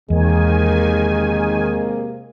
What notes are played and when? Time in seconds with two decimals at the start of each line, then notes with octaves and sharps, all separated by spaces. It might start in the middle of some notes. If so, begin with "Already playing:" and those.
0.10 E2 C3 D#3 G#3 A#3 G#5